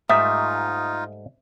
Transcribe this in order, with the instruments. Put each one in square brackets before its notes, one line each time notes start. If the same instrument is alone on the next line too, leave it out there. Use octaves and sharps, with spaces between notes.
[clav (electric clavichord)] G#2 G3 A3 [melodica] D#4 F4 [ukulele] E5 [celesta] D#6